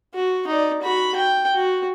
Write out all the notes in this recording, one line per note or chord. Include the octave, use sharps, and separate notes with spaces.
F#4
D#4 D5
F#4 B5
G5
F#4